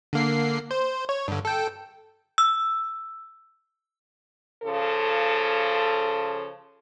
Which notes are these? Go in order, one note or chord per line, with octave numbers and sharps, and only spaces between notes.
D3 A#3 C7
C5
C#5
G2 D3
A4 G5
E6
C#3 F3 A4